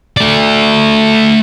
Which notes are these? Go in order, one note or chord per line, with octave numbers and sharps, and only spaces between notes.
A3 D5